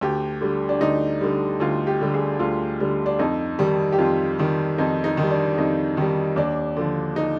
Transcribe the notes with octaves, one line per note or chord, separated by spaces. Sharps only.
D2 G4
D3 G3
D4
D2 D#4
D3 G3
D2 F4
G4
D3 G3
G#4
D2 F4
D3 G3
D4
F2 D#4
D#3 G3
G4
F2 F4
D#3 G3
F2 D#4
D#4
D#3
G3
D4
F2 D#4
D#3 G3
D#2 D4
D3 F3
D#4